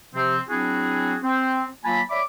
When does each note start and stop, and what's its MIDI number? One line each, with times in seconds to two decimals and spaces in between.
0.14 0.38 48
0.14 0.38 53
0.14 0.38 60
0.48 1.16 54
0.48 1.16 60
0.48 1.16 62
0.48 1.16 64
0.48 1.16 66
0.48 1.16 68
1.23 1.66 60
1.84 2.00 54
1.84 2.00 58
1.84 2.00 65
1.84 2.00 80
1.84 2.00 81
1.84 2.00 83
2.10 2.22 73
2.10 2.22 74
2.10 2.22 76
2.10 2.22 83
2.10 2.22 86